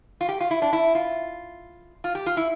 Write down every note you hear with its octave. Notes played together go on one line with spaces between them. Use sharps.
F4
G4
F4
E4
D4
E4
F4
F4
G4
F4
E4